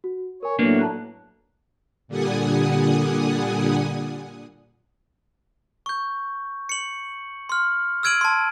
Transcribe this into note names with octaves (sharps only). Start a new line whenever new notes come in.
F#4
A#4 C#5 G#5
A2 F#3 A#3 B3 D4 B4
A5 A#5 F#6
A#2 D3 G3 F#5 G#5 D#6
C#6 G6
C#7 F#7
C6 F6
E6 F6 G#6 D7 D#7 F#7
A5 C6